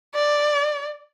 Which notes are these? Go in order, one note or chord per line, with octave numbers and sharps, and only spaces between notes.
D5